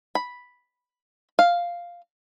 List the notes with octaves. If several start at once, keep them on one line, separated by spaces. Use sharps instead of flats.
B5
F5